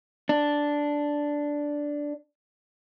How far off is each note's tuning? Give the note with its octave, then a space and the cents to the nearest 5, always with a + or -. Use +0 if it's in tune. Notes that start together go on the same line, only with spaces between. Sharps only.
D4 -5